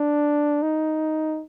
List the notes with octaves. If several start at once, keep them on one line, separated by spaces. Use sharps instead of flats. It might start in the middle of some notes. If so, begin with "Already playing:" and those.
Already playing: D4
D#4